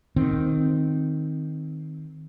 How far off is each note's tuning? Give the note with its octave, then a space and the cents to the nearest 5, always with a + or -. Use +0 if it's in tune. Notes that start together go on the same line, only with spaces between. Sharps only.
D#3 +0 C4 +0